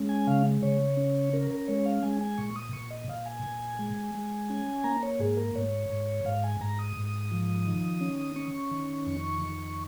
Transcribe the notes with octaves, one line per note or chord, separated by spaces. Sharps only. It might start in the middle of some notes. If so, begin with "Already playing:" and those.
Already playing: G#3 C#4
G#5
C#3 F5
C#3 C#5
C#4
C#4 A#4
A#4
G#3 C#5
F5
G#3 G#5
G#5
A#2 C#6
D#6
A#2 C#6
D#5
A#2 F5
G#5
A#2
G#3
G#3
C#4
A#3 A#5
C#5
G#2 G#4
A#4
G#2 C#5
G#2
G#2 F5
G#5
G#2 A#5
D#6
G#2
F3
D#3
C#4
C#4 C#6
D#3
F2
D#3